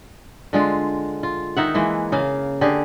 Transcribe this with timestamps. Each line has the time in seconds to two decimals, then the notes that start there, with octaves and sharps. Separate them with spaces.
0.53 D3 G#3 F4
1.23 F4
1.57 D#3 D#4 E5 F#5
1.75 E3 G#3 A#3
2.12 C#3 A#3 F5
2.61 D3 G4 G#4